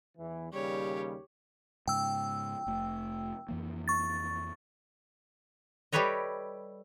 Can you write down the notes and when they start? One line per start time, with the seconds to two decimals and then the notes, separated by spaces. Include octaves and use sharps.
0.18 E2 E3
0.53 D#2 C#3 G3 G4 C#5
1.88 G#2 C#3 G5 E6
2.67 F1 A3
3.49 F2 E3 A#3
3.88 C#6 A6
5.92 G3 G4 A4 B4 C#5 D#5